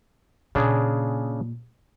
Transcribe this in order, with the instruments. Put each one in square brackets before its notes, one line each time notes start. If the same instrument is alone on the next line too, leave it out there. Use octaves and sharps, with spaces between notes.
[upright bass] A#2 [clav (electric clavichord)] C#3 D4 G#4